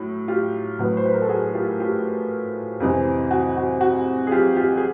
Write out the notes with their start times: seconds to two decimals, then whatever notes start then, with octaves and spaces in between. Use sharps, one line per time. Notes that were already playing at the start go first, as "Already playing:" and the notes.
Already playing: A2 F#3
0.28 F4 G4
0.79 A2 F#3 B3
0.97 C5
1.06 B4
1.13 A#4
1.22 A4
1.29 F#4 G#4
1.54 F4 G4
1.80 F4 G4
2.80 F2 C3 E3 G#3
3.31 F#4
3.57 F#4
3.81 F#4
4.27 G#4
4.31 F4 G4
4.56 F4 G4
4.77 G#4